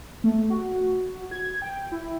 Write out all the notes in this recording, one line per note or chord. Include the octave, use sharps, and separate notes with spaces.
A3
F#4
G#6
G5
E4